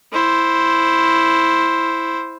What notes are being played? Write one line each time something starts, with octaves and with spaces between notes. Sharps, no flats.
E4 C5